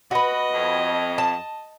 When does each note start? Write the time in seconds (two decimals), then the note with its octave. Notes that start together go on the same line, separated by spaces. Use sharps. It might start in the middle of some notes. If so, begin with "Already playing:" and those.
0.11 F#4 B4 D#5
0.52 F2
1.18 A5